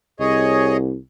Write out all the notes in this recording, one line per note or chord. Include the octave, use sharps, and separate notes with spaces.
C2 G#4 C#5 D#5